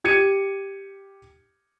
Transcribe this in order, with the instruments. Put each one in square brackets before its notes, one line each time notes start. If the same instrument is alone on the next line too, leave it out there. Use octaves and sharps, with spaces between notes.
[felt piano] G4 G#6 C#7 D#7